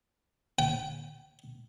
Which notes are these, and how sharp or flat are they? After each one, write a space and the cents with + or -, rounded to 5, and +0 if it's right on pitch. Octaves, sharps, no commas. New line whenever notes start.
G5 -35